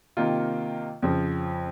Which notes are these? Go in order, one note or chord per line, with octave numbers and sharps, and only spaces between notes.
C3 D#3 A#3 F4
F2 C#3 F3